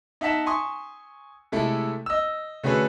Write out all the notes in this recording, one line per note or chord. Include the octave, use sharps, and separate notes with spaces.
D#4 E5 F#5 A5 B6 E7
G#5 C6 C#6 D#6
C3 G#3 A3 E4 A4
D#5 E6
D3 A3 C#4 F#4 G#4 B4